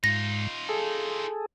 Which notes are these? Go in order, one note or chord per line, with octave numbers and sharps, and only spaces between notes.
G#2 D#4 F4 A#6
G#4 A4